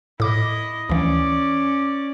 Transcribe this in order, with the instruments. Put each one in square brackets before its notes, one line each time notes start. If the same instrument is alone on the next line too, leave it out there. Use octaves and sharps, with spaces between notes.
[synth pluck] A2 D6 [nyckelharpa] E4 D#5
[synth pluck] D2 E3 [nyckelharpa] C#4 D5